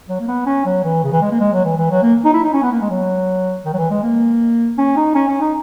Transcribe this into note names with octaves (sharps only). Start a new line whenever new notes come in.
F#3
A#3
B3
C#4
F#3
E3
C#3
E3
G#3
A#3
G#3
F#3
E3
E3
F#3
A#3
D#4
E4
D#4
C#4
B3
A#3
G#3
F#3
D#3
F#3
E3
G#3
A#3
C#4
D#4
C#4
C#4
D#4